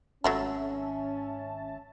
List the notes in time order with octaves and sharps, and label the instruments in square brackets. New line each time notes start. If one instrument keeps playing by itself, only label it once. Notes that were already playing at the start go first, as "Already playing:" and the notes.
[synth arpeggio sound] G#1 E5 A5 [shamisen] F#3 A3 A4 [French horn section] C#4